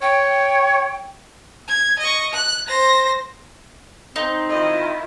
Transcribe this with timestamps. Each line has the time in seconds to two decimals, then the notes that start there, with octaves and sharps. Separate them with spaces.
0.02 C#5 G5
1.68 G#6
1.99 D#5 C#6
2.34 F#6
2.68 C5 A#6
4.16 C4 D#4
4.49 D#3 E4 F4 D#5